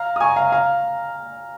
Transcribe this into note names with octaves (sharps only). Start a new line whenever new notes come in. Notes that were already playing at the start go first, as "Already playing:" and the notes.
Already playing: F5 A#5
D#6
G#5 C#6
F5 A#5
F5 A#5